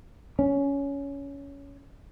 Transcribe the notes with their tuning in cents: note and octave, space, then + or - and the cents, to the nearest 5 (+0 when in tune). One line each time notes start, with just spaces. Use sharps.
C#4 +15